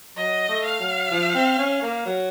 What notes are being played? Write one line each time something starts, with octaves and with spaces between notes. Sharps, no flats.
F#3 D#5
A3
F5
F#3
F3
C4
C#4
A#3
F#3